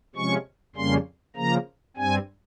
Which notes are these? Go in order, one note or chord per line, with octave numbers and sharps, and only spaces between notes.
C3 F3 G#3 C#4 C#6
F2 C#3 G3 A#3 C#4 C6
C#3 F3 A#3 A#5
G2 G3 C4 G#5